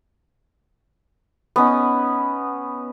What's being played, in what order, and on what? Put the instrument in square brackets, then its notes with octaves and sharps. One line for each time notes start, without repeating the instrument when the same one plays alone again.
[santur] B3 C#4 D#4